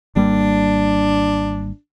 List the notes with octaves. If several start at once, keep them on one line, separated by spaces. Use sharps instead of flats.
G#1 G3 A#3 D4